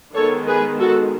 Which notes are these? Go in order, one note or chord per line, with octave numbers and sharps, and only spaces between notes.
D#3 G#3 B3 A4 C#5
G#4 B4
F#4 A4